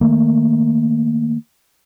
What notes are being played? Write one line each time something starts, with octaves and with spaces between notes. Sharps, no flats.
D#3 A3 A#3